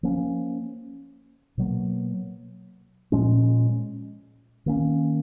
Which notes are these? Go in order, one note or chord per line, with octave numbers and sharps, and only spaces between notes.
F3 A#3 C#4
B2 F#3 A#3
A#2 F3 G#3 C#4
D#3 A#3 C#4